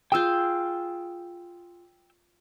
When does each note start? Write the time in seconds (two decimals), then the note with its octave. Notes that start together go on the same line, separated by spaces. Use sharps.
0.12 F4 G#4 G5 E6 G6